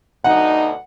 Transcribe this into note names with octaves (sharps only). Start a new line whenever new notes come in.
D2 B2 D#4 F#5